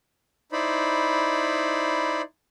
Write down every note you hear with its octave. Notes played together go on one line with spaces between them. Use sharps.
D#4 E4 C5 D5 B5